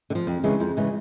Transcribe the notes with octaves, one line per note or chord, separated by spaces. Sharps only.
D3
F3
F2
C#3 E3 G#3
F2
C#3 E3 G#3